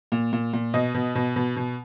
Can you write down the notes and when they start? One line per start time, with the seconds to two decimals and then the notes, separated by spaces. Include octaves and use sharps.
0.12 A#2
0.33 A#2
0.53 A#2
0.74 B2 D#5
0.94 B2
1.15 B2
1.36 B2
1.56 B2